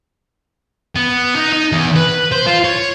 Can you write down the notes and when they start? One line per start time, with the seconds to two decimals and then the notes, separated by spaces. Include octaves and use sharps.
0.96 B3
1.35 D#4
1.52 D#4
1.72 E2
1.96 B4
2.32 C5
2.46 F4
2.65 C#5